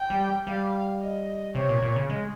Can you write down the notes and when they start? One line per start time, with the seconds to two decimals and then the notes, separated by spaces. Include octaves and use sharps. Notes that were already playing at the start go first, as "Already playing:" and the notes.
Already playing: G5
0.10 G3
0.47 G3 F5
1.01 D#5
1.55 C3 C#5
1.69 A#2
1.82 A#2
1.96 C#3
2.09 G#3